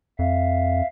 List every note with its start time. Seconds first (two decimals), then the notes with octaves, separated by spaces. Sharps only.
0.19 F2 E5 F5